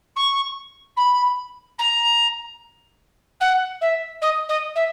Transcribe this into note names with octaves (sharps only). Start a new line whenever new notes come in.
C#6
B5
A#5
F#5
E5
D#5
D#5
E5